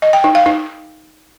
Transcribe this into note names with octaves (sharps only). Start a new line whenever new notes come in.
D#5
G5
D#4
F5
D#4